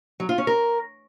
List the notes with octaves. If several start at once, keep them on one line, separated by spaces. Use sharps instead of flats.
F#3
F4
C#4
A#4